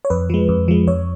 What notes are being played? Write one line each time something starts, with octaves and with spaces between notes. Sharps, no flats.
C#5
F2 B4
F3 G#3
F2
F3 G#3
F2 C#5